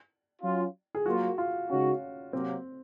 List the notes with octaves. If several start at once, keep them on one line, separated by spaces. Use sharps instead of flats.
F#3 C#4 F4
G#4
F#3 A#3 F4 F#4
F4
C#3 G#3 C#4 D#4 F#4
C3 F#3 A#3 C4